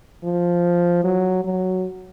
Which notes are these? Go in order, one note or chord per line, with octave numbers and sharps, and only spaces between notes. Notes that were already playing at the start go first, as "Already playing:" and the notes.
F3
F#3
F#3